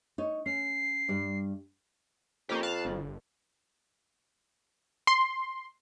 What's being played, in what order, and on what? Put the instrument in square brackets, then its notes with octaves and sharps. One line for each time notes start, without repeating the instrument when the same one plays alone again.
[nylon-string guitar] D#4 C#5
[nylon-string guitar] C#4 [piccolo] C7
[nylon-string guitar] G2 G3 D5
[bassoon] F2 [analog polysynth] A#3 C#4 G4
[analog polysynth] F5 A5 F#6
G1
[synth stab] C6